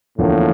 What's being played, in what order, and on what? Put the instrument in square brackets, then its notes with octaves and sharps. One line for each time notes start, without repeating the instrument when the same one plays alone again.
[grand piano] E2 D3 F3 A#3 [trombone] A2